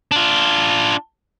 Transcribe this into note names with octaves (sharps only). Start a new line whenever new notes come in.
D4 F4